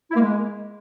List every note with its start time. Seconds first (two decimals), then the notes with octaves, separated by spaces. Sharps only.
0.10 E4
0.15 A#3
0.21 G#3